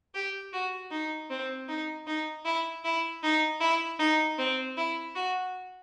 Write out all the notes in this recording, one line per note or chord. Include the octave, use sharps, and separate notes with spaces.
G4
F#4
D#4
C4
D#4
D#4
E4
E4
D#4
E4
D#4
C4
E4
F#4